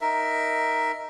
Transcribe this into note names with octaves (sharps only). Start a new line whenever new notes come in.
D#4 A#4 E5